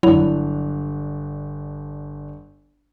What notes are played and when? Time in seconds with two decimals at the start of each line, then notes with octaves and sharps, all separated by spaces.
0.03 G1 F#3 D4 E4 F7